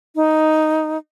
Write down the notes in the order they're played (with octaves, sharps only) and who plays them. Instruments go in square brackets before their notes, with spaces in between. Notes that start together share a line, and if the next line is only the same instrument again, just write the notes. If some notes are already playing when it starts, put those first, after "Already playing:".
[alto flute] D#4